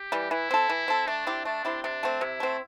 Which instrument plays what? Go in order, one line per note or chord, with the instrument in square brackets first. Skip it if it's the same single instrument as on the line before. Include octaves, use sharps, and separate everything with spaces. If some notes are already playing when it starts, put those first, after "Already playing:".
Already playing: [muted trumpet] G4
[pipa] E3 G3
[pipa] E3 [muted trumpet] E4
[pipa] C4 A4
E3
C4 A4
[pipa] A3 [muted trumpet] D4
[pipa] C4 E4 G4
[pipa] A3 [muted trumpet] D4
[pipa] C4 E4 G4
[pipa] C3 [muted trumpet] D4
[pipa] A3 C4
[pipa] C3 [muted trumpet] E4
[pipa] A3 C4